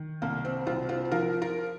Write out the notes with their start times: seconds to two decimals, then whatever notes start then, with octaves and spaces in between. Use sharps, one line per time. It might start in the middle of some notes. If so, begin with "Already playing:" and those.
Already playing: D#3
0.22 C2 A#3
0.45 C4
0.67 C2 C4 F4
0.89 C4 F4
1.12 F3 F4 A#4
1.42 F4 A#4